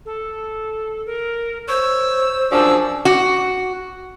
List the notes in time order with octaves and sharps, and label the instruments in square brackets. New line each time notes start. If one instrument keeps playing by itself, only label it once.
[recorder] A4
A#4
[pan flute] C5 [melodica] C#5 [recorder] E6
[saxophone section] F#2 F3 D4 [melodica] F#4 G#4 [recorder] E6
[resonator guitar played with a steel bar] F#4